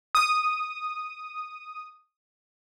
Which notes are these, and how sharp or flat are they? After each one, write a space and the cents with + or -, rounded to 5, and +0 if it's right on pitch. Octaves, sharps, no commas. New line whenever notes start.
D#6 -5